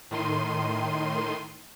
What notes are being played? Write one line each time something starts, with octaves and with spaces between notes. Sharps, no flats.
A2 D#3 C6 D#7